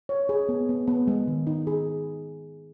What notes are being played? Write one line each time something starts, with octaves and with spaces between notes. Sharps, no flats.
C#5
G#4
B3
B3
B3
G#3
D#3
D#4
G#4